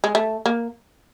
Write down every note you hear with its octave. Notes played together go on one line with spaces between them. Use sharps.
G#3
A3
A#3